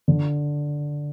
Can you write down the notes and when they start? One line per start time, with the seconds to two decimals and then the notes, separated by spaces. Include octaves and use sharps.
0.08 D3